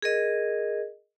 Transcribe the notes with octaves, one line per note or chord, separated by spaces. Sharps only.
G#4 A#4 D#5